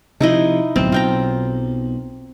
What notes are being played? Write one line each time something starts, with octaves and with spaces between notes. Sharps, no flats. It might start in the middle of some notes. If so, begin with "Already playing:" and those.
C3 F3 D#4 E4 D#5
D1 B1 C4
B1 F4 G5 A#5